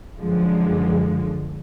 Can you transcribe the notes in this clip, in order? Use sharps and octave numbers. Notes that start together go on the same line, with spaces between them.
F#2 D3 F3 G#3